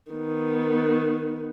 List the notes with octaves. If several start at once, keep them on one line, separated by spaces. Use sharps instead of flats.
D#3 B3